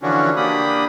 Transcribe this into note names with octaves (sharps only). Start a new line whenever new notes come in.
D3 E3 F3 C#4 D4 F#4
A#3 D4 G4 B5 D#6